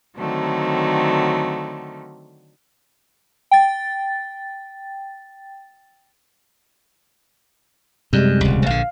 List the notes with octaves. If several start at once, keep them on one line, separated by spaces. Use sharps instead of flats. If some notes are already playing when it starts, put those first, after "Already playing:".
D3 D#3 F#3 A3 C4
G5 A6
F#2 C3 G3 G#3
D#1 C#2
A#1 D3 F5